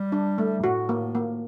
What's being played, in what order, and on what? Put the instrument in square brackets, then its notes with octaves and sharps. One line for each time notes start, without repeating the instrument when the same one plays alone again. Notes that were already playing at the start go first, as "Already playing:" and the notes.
Already playing: [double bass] G3
[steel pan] D4
A3
[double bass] A2 [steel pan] F#4
[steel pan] A#3
A#3